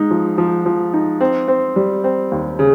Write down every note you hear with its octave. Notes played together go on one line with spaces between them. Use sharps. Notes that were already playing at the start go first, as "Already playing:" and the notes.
Already playing: G#2 D#4
F3
F3
F3
D#4
C4
C4
G3
C4
D#2
C#3